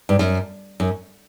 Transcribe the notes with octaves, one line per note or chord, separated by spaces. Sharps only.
G2
F#2
F#2